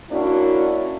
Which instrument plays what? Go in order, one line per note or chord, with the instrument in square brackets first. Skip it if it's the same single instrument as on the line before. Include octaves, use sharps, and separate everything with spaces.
[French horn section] A#3 C#4 D4 E4 F#4